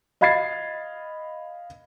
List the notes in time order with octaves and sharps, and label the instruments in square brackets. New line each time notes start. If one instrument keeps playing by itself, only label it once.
[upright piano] D#5 F5 B5 G#6 A6 C7